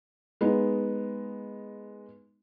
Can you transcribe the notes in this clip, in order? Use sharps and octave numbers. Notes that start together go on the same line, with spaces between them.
G#3 B3 D#4